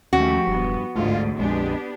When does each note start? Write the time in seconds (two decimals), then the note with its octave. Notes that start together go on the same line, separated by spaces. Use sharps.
0.13 D#2 F3 A3 C#4 F#4 G4
0.47 E1 G2 B3
0.96 A1 D2 G#2 D3 A3 F4
1.39 A#1 F2 G#3 B3 D4 G4